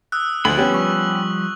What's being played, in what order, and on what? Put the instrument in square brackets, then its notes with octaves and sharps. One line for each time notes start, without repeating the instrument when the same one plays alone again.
[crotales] D#6 E6 F#6
[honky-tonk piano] D2 [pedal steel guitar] F3 G#3 B5 [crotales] F#7
[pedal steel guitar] F3 G3 [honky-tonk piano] B3 C#4 G4
[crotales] C#6